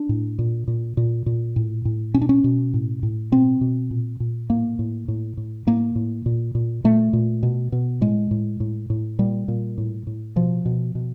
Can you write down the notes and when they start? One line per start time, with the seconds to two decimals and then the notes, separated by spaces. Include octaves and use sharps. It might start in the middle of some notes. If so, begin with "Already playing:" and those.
Already playing: D4
0.09 A2
0.39 A#2
0.68 A#2
0.97 A#2
1.26 A#2
1.56 A2
1.85 A2
2.14 B2 C#4
2.21 D4
2.29 C#4
2.44 B2
2.74 A2
3.03 A2
3.32 B2 C4
3.61 B2
3.91 A#2
4.20 A#2
4.50 A2 A#3
4.79 A2
5.08 A2
5.37 A2
5.67 A2 A#3
5.95 A2
6.26 A#2
6.55 A#2
6.84 A#2 A3
7.13 A#2
7.43 B2
7.72 B2
8.01 A2 G#3
8.31 A2
8.60 A2
8.90 A2
9.19 A#2 G3
9.48 A#2
9.78 A2
10.07 A2
10.36 B2 F3
10.65 B2
10.95 B2